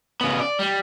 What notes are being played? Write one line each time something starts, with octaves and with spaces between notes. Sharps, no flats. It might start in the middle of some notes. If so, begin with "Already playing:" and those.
C#3 B3
D5
G3